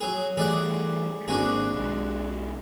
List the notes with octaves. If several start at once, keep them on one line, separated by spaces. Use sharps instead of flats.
F#3 G#4
E3 G3 A3 G#4 D5 F#5
G#1 A#3 C4 D4 F#4 G#4
B1 G#3